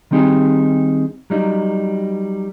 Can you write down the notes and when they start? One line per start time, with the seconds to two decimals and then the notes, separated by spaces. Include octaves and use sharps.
0.11 D#3 G3 C4 D#4 G4 G#4
1.30 F#3 G3 D#4